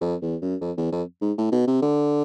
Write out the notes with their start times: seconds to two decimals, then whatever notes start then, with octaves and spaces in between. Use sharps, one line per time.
0.01 F2
0.22 E2
0.42 F#2
0.61 F2
0.77 E2
0.92 F2
1.22 G#2
1.38 A2
1.52 B2
1.67 C3
1.82 D3